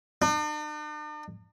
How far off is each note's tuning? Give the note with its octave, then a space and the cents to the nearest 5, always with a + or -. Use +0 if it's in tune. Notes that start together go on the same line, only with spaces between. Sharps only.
D4 +45